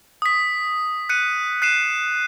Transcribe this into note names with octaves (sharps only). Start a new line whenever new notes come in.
D#6 B6
F#6 C#7 D#7
F#6 C7 D#7 E7